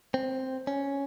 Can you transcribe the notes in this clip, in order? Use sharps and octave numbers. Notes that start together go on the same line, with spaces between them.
C4
C#4